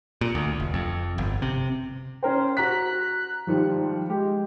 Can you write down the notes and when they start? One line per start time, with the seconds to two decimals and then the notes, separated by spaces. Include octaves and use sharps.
0.21 A#2
0.35 D2
0.60 F1
0.74 F2
1.18 G1
1.42 C3
2.23 C#4 A#4 C5 G5
2.57 F#4 A#5 F#6 B6
3.47 G#2 D#3 F3 G3
4.10 G#3 G4